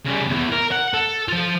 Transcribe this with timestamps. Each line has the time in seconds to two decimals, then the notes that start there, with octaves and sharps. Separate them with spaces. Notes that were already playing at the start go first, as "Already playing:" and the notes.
0.05 C#3 G3
0.29 E2 E3
0.52 A#4
0.72 F#5
0.94 A4
1.29 F3 F4